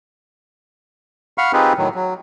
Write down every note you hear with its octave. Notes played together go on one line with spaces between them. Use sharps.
F5 F#5 B5 C#6 F6
C4 D#4 F4 G4 G#4 B4
A2 D#3 F#3
F#3